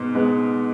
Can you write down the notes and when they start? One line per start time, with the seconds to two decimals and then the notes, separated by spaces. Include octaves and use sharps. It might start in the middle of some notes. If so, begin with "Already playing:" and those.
Already playing: G#2 B2 B3
0.15 G#3 B3